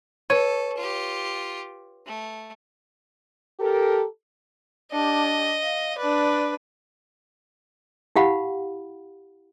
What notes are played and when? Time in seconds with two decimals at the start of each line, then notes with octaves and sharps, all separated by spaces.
0.30 A4 B4 C#5 D#7
0.77 F4 G4
2.07 A3
3.60 G4 A4 A#4
4.92 D4 G4 D#5
5.62 F5
5.98 D4 B4 D5
8.16 E4 G4 F5 F#5 B5